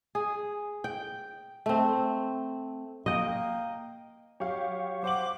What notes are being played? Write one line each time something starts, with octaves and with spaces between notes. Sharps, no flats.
G#4
G5
A3 C4
A#3 D#5 G5
F#3 G4 C#5 F5
C5 F#5 D6 F#7